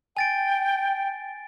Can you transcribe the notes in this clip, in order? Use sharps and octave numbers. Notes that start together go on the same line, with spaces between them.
G5 G#5 A6 D7